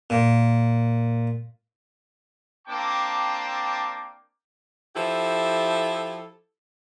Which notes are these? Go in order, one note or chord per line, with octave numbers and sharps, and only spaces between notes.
A#2
A#3 C4 D4 G5 A5 D6
F3 E4 G4 A4